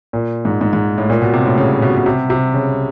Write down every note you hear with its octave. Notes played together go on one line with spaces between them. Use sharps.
A#2
G#2
G#2
G#2
A2
A#2
B2
C3
A2
C#3
B2
B2
C3
C3
C#3